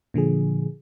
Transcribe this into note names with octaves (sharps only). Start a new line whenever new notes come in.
A#2 D3 F3 G#4